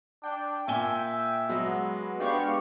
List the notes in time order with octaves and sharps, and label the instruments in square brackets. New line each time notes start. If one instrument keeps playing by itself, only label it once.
[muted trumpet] D4 [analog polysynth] G5
[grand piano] A#2 G#5 G7 [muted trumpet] E5
[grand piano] F#3 G#3 [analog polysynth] B3
[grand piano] G#3 D4 [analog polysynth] B3 F5 C#6 [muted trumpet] G4